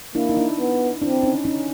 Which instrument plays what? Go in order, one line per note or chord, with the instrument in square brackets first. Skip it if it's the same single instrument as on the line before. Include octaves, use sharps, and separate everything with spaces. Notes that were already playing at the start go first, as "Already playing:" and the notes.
[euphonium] A#3 [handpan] D4 E4
[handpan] D#4
D4 E4
[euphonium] B3
[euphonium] C4 [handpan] D4 E4
[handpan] C#4 D#4
C#4 D#4